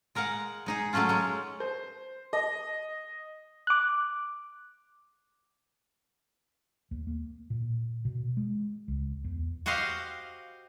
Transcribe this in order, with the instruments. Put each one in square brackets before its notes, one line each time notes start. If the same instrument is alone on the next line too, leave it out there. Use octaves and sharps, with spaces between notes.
[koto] G#3 A#4 F5 F#5
G#3 D#4 G#4
F#3 G#3 A3 C#4 F4
G#3 C#5
[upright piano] C5
D#5
[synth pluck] D6 F#6
[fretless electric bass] D#2
A#3
A#2
B2
G#3
C#2
E2
[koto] F#4 G4 C5 D#5 F5